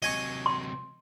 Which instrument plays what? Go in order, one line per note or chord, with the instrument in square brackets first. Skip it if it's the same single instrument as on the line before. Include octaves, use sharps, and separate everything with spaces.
[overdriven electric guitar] C3 F#3 [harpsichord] D#5 G#5 C#6
[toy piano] C6